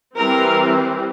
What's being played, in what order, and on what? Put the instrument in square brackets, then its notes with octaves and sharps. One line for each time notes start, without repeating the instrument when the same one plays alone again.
[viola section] E3 G3 C4 A#4